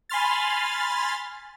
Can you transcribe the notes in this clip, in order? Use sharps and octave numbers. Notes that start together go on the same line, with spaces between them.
G#5 B5 C6 F6 A6